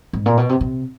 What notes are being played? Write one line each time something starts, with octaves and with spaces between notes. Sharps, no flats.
G#2
A#2
B2
C3
C3